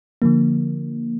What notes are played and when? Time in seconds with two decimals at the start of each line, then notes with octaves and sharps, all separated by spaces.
0.22 D3 F3 A#3